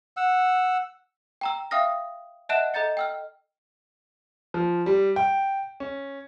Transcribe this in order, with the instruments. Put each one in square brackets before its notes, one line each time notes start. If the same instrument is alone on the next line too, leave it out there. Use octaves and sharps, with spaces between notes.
[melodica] F#5 E6
[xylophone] G5 A#5 E6
E5 F5 G5 D#6 F6 A#6
D#5 E5 F#5 A5 F#6 E7
A4 D#5 A#5 G6 A6 C#7
G5 E6 F6
[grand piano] F3
G3
G5
C#4